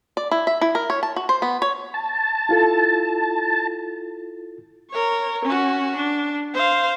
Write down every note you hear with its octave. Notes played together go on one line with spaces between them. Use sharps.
D5
E4
E5
E4
A#4
C#5
A5
F#4
C5
B3
C#5
A5
E4 F4 A4
A#4 C#5
C#4 F#4
D4
C5 F5